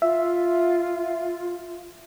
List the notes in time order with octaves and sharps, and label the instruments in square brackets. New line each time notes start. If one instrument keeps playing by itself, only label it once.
[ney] F4 [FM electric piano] E5